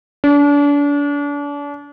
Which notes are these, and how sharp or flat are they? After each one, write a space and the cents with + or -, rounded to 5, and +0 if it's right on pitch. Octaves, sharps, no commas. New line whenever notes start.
D4 -35